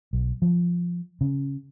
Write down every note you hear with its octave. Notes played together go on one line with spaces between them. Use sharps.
B1
F3
C#3